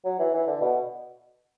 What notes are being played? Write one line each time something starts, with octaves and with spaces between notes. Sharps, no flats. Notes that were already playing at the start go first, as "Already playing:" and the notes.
F#3
E3
E3
D3
B2